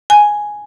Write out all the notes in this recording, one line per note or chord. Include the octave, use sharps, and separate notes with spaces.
G#5